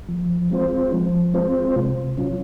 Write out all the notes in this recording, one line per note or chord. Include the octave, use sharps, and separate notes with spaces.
F3
G#3 C4 F4 C5
F3
G#3 C4 F4 C5
C3
F#3 C#4 F4